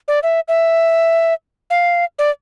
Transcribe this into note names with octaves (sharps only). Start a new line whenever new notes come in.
D5
E5
E5
F5
D5